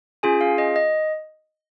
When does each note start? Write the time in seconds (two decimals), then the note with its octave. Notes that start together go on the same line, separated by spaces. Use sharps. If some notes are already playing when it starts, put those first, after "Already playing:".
0.23 C#4 F4 G#4 G#5
0.41 F5
0.58 D#5
0.76 D#5